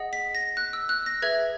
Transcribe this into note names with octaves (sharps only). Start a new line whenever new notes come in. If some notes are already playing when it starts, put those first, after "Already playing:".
Already playing: G#4 D#5 F#5
B6
A#6
F#6
E6
F#6
A#6
G#4 B4 E5 G#6